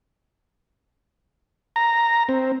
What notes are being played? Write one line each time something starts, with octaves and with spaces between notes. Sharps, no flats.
A#5
C4